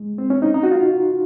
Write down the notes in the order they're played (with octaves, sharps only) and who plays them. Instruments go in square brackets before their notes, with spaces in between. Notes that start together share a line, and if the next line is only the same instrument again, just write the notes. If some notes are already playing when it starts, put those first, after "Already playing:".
Already playing: [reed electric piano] G#3
C4
C#4
D#4
D#4
F#4
F4